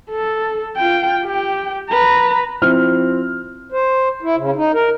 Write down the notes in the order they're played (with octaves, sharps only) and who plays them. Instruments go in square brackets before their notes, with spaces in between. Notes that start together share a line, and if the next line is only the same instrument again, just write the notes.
[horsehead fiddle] A4
F4 G5
G4 G5
B4 A#5
[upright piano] F3 C4 E4 F6
[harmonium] C5
E4
C#3
D#4
A#4